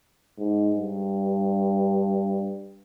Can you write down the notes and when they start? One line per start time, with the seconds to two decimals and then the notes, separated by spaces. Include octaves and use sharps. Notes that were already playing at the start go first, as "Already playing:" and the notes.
0.38 G#2
0.76 G2